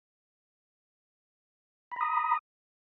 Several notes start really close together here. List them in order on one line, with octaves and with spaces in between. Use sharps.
B5 A#5 D#6